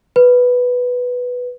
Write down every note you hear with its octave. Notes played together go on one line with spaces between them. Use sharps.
B4